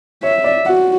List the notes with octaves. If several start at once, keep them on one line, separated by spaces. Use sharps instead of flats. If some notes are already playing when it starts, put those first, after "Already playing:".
C#5 E5
D5
F#4 F#5